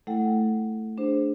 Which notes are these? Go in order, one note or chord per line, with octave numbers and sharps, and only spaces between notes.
A3 E4 A4 F#5 G5
D4 G#4 C5